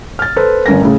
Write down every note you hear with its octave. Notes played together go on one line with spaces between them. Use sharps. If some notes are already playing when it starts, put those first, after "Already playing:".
F6 A6
A4 B4 C5
G1 C#4 A#4 A#6
A2 C#3